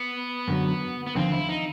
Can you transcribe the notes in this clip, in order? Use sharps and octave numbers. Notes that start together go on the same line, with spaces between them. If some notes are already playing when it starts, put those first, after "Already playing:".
Already playing: B3
F#2 D3 F#3
B3
D#2 D3 F3 C4
E4
D#4